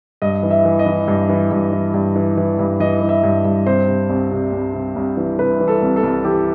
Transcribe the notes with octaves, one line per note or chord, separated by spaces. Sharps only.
G2 D#5
E3
E5
E3
D#5
E3
G2
E3
G2
E3
G2
E3
E3
G2
E3 D#5
E3
E5
G2
G2
C3 C5
C3
C2
C3
C2
C3
C2
E3
C3 B4
E3
A4
C2
A4
C2
E3 G4